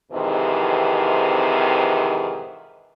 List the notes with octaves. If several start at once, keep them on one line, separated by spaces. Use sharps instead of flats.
F2 G#2 C3 D#3 E3